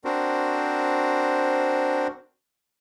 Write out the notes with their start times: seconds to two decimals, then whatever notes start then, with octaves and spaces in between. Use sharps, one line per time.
0.05 C4 D4 F#4 A#4 C5